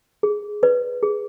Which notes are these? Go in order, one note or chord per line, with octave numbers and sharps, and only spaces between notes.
G#4
B4 D5
G#4